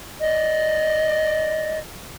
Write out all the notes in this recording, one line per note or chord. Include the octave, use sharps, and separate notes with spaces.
D5 D#5